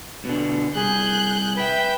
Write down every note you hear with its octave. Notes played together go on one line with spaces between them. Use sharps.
B2 D3
C2 G#4 F#6 G6
B4 E5 G5